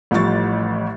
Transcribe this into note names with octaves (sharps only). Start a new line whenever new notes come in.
A1 A2 F3 G3 C#6 A6